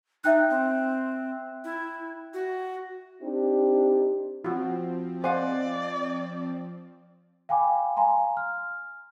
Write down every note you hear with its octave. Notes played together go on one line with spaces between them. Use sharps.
D#4 E5 G5 F#6
C4
E4
F#4
C4 D4 D#4 G4
F3 C4 F4 F#4
C5 D5 D#5 F5 F#5 G#5
F5 G5 G#5 B5 D6
F5 G#5 A#5 C6
F6